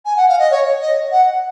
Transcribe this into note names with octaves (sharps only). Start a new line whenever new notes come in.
G#5
F#5
F5
D#5
C#5
D#5
F#5